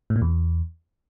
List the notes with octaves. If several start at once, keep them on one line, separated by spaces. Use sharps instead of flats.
A2
A#2
E2